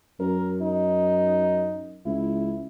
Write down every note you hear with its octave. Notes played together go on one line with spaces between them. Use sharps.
F#2 A#4
D#4
C#2 E4